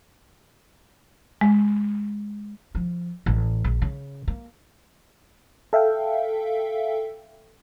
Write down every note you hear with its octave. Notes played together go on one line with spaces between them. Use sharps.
G#3
F3
A1
A#1
C#3
A#3
A4 E5 F5 G5